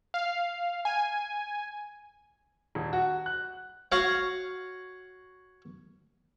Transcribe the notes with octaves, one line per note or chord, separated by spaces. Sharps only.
F5
G#5
D#1
F#4
F#6
F#4 C#5 F5 F#5